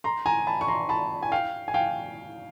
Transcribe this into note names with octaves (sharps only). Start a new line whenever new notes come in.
A#5 C6
G#5 A#5
A5 B5
C#6
A#5 C6
A5 B5
G#5
F5 G5
G#5
F5 G5